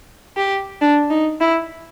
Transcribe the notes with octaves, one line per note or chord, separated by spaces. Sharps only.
G4
D4
D#4
E4